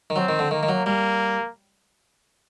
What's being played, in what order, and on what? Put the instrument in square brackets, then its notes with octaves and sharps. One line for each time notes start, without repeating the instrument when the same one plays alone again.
[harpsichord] D#3
[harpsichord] F#3 [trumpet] C4
[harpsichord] D#3
D3
[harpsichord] D#3 [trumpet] A#3
[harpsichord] D#3
F#3
[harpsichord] G3 [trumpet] A#3